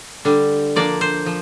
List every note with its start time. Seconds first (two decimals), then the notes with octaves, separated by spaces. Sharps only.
0.25 D3 G3 D4
0.76 F3 A#3 D4 D5
1.01 C5
1.26 F3